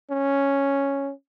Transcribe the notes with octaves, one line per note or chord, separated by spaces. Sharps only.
C#4